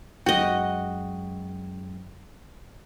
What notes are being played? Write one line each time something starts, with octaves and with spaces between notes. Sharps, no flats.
F#2 G#3 F#4 D#5 G5